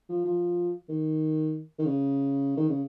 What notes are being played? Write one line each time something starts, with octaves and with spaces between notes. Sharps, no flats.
F3
F3
D#3
D#3
C#3
D#3
C#3